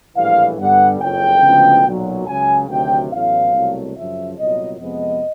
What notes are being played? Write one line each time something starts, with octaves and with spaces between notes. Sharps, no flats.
A#1 A2 E3 G3 F5
G2 D3 G3 B3 F#5
F#1 F2 C#3 F3 G5
D2 C#3 F3 G#3 B3
B1 A#2 F#3
C#2 C#3 F#3 G#5
D2 C3 D#3 F#3 G5
A1 A2 F#3 B3 F5
C2 B2 F#3 A3
F#2 C#3 F3 E5
C2 A#2 F#3 B3 D#5
F2 C3 F3 G#3 B3 D#5